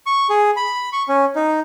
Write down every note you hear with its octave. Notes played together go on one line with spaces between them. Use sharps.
C#6
G#4
B5
C#6
C#4
D#4